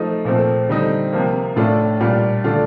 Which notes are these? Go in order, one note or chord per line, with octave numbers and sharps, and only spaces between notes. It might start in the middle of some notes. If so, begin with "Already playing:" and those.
Already playing: F3 A3 D#4
A#2 F3 A3 C4
D3 G3 C4 D#4
C3 F3 A#3
A2 A3 D4 F4
A#2 G3 D4 F4
D3 A3 D4 F4